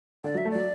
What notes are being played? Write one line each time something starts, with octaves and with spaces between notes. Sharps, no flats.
D3 D5
F#3 E5
A3
F#3 D5